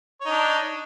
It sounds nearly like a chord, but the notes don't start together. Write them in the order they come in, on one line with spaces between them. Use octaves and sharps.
C#5 D#4 D4